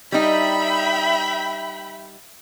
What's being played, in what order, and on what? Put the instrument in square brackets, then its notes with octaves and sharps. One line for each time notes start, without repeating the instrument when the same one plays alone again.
[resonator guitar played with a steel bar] G3 D#4 [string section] E5 G5 B5